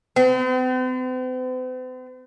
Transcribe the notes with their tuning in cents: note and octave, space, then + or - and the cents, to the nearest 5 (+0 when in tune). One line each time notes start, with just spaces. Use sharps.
C4 -45